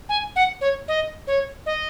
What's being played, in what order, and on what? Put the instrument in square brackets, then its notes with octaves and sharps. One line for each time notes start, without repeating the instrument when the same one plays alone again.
[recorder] G#5
F#5
C#5
D#5
C#5
D#5